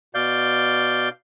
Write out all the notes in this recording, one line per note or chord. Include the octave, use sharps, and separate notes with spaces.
B2 D5 F5 G6